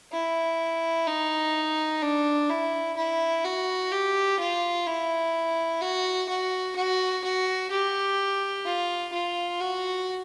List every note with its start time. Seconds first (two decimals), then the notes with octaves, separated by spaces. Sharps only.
0.12 E4
1.07 D#4
2.02 D4
2.50 E4
2.97 E4
3.45 F#4
3.91 G4
4.39 F4
4.86 E4
5.81 F#4
6.29 F#4
6.75 F#4
7.24 F#4
7.71 G4
8.65 F4
9.13 F4
9.61 F#4